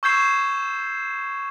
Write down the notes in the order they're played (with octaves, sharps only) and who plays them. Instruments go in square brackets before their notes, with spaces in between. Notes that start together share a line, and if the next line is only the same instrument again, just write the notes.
[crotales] C#6 E6 G6 G#6 C7 E7